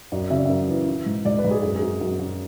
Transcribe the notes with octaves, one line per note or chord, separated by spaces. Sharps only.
F#2 D5
C#3 E5
D5
F#2 E5
E3
E3
G#2
G#2 D5
B4
G#2
G#4
F#2 G#4
G#4
F#2
F#2
F#2